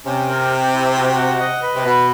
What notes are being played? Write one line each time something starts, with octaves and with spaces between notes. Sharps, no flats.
C3 C#4
A#4
G4
E4
F#4
F#5
D#5
B4
C3
B2 B3